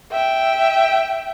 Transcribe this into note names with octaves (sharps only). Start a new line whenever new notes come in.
E5 G5